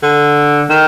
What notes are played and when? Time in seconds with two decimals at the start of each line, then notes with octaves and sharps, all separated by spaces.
0.03 D3
0.69 D#3